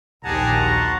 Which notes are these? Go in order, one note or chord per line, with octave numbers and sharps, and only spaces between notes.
A#1 D#2 G4 G#4 F#5 A5 A#5
F#4 C6 C#6